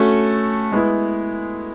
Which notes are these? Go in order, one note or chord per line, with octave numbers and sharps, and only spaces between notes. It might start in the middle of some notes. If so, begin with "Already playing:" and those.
Already playing: A3 C#4 F#4 A4
G#3 B3 E4